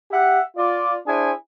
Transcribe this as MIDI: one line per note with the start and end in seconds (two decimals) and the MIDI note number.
0.11 0.41 67
0.11 0.41 76
0.11 0.41 78
0.56 0.96 65
0.56 0.96 74
1.07 1.32 62
1.07 1.32 64
1.07 1.32 68
1.07 1.32 72
1.07 1.32 80